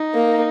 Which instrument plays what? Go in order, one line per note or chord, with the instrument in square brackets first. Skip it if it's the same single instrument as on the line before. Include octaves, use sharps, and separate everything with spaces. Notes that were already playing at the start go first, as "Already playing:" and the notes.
Already playing: [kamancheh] D#4
[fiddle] A#3